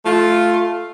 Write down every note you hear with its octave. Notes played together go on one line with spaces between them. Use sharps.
A3 F4